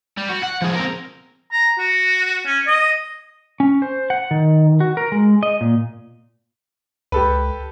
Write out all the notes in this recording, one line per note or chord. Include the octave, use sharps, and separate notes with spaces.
G3
F#4
F#5
F3 G#4
C4 A#4
A#5
F#4
C#4
D#5
C#4
C5
F#5
D#3
F#4
A#4
G#3
D#5
A#2
C#2 G4 A4 B4